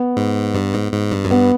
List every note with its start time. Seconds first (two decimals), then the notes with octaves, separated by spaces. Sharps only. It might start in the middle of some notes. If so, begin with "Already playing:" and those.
Already playing: B3
0.17 G#2
0.54 G2
0.74 G#2
0.93 G#2
1.12 G2
1.25 F#2
1.31 G2 B3